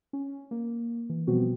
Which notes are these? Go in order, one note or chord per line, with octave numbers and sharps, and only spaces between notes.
C#4
A#3
E3
B2 F3 G3 B3 C4 F#4